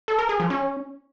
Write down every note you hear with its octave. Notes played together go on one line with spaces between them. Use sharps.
A4
A#4
G#4
F3
C#4